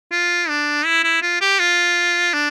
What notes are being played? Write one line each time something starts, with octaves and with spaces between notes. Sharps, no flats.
F4
D4
E4
E4
F4
G4
F4
D4